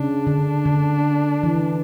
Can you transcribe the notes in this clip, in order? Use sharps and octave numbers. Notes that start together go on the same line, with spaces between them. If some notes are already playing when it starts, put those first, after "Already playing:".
Already playing: C#3 D4
D3
D3
E3